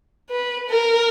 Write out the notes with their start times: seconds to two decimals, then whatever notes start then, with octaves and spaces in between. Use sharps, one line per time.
0.30 B4
0.70 A#4